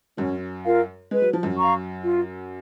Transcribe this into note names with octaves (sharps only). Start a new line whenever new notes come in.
F#2 F#3 C#4
F4 A#4 F5
G#3 B4
F#3
F3
F#2 F#3
F5 A#5 C#6
F4